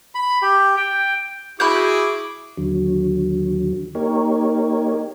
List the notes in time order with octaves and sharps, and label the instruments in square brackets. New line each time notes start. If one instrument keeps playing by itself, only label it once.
[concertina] B5
G4
G5
[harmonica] E4 G#4 [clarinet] F#4 [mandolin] B5 F#6 G6 [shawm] D6
[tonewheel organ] D#2 D3 F#3
A#3 D#4 G4 A#4 C#5